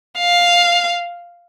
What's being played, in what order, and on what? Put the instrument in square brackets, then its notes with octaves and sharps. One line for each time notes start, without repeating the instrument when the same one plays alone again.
[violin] F5